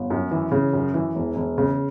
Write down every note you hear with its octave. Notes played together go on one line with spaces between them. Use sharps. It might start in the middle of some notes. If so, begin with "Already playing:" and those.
Already playing: G1
F#2
E3
C#3
F#2
E3
E1
E1
C#3